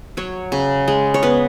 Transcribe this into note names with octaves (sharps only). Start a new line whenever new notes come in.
F#3 C#5
C#3
G#3
C#5
B3 B4